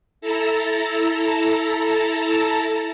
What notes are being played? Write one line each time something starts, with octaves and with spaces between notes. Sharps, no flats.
E4 A4 A5 A#5